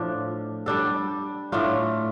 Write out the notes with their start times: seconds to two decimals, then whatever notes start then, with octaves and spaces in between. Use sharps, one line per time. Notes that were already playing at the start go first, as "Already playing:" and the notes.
Already playing: A2 F3 D4
0.66 G3 D4 A4
1.52 A2 A3 D4 F4